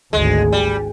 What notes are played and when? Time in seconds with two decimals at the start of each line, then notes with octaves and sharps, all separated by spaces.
0.13 G#1 D2 G#3
0.52 G3